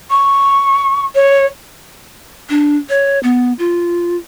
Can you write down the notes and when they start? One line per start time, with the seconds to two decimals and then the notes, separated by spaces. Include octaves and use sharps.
0.10 C#6
1.15 C#5
2.50 D4
2.89 C#5
3.23 B3
3.59 F4